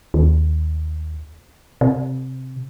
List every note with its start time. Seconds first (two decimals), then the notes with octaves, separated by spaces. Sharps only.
0.14 D#2
1.81 C3